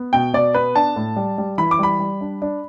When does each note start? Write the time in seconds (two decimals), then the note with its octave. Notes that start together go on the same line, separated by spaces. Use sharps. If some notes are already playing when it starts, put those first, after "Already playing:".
Already playing: B3
0.13 B2 G5
0.33 B2 D5
0.54 B3 B4
0.76 D4 A5
0.96 A2
1.16 G3
1.38 G3
1.58 E3 B5
1.71 D6
1.79 G3 B5
1.99 G3
2.21 D4
2.42 D4